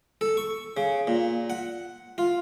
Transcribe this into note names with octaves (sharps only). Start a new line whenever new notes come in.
A4
C#6
C#3
A#2
F#5
F4